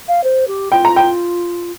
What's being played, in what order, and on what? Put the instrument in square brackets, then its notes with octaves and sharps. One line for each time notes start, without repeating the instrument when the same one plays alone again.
[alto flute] F5
C5
G4
[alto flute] F4 [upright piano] G5
[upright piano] A#5
G5